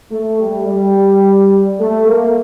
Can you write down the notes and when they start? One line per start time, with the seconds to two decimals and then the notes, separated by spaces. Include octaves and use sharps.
0.12 A3
0.40 G3
0.67 G3
1.79 A3
2.07 A#3